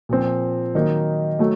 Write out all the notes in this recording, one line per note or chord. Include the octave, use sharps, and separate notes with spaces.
A#2 F3 C4
D#3 F#3 A#3 D#4
F#3 A3